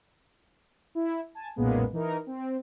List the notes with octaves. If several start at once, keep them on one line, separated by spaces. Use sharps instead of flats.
E4
G#5 A5
B1 F#2 A#2 G#3 A#3 B3
E3 D#4 A#4
C4